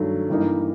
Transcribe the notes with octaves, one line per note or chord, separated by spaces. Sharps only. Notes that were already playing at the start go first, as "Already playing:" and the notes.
Already playing: G2 D#3 F#3 A3
G2 E3 G3 A#3 D#4